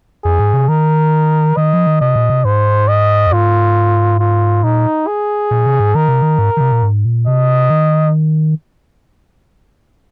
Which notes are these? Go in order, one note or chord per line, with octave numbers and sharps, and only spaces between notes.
F2 G#4
G#2
C3
D#3 A#4
D#3 D#5
F3
D#3
C3 D#5
A#2
C3
G#2 C5
D#5
F2
G#2 F4
F4
A#2 D#4
G#4
A#2
C3
G#2
D#3 A#4
C3
D#3
G#2
D#3
C3
A#2
G#2
A#2
C3 D#5
D#3